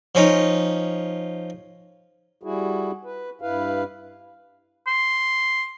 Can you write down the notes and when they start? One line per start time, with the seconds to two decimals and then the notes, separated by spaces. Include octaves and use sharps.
0.15 F3 C#4 D#4
2.43 G3 E4 F#4 G#4
3.05 B4
3.42 G2 E4 B4 F5
4.87 C6